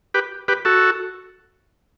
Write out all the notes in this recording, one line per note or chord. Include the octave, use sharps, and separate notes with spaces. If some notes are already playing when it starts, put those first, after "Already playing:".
G4 B4
G4 B4
F#4 A4